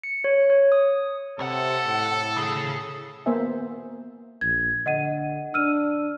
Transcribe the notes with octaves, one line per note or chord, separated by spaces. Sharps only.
C#7
C#5
C#5
D#6
C2 C3 A4 F#5
A2
C#3 G#4
A#3 B3 C5 E5 G#5
A#1 G#6
D3 D#5 F#5 D#7
D4 E6 F6 D#7